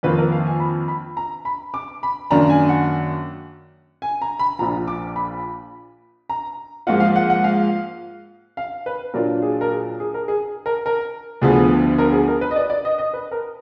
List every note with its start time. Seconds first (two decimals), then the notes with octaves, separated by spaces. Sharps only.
0.03 F2 D#3 A#3 F4 B4
0.18 A#4
0.32 F5
0.47 G#5
0.60 B5
0.88 B5
1.17 A#5
1.45 B5
1.74 D6
2.03 B5
2.31 F#2 D#3 A#3 D4 A#5
2.50 G#5
2.69 F#5
4.02 G#5
4.22 A#5
4.39 B5
4.59 A#1 A#2 F3 A#5
4.88 D6
5.16 B5
6.29 A#5
6.87 G#2 F3 A#3 F4 F#5
7.00 F5
7.16 F#5
7.30 F#5
7.44 F5
8.57 F5
8.86 B4
9.14 A#2 F#3 D4 F4 A#4
9.42 G#4
9.61 A#4
9.71 G#4
10.00 G#4
10.14 A#4
10.28 G#4
10.66 A#4
10.86 A#4
11.41 D2 D3 F3 B3 G#4
11.98 A#4
12.13 G#4
12.28 A#4
12.41 B4
12.51 D#5
12.56 D5
12.70 D5
12.85 D#5
12.98 D#5
13.13 B4
13.31 A#4